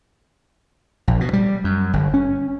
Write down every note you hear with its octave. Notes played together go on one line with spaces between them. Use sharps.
A#1
B2
G3
F#2
G1
C#4